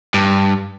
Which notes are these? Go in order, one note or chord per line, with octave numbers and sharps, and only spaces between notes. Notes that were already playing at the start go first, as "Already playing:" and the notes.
G2